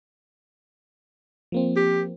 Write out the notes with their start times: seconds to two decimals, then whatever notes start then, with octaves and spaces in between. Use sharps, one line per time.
1.52 F3 A#3 C4
1.76 G4